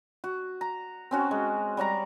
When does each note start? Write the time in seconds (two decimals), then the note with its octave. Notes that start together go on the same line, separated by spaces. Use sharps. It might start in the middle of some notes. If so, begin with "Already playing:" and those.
0.24 F#4
0.61 A#5
1.11 C4 C#4 F#4
1.31 G#3
1.77 G3 C#5 F#5 A#5